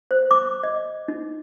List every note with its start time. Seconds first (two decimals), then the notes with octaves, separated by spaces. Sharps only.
0.11 C5
0.31 D6
0.63 D#5
1.08 D#4